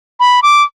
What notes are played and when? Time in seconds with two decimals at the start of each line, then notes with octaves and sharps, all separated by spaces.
0.20 B5
0.43 D6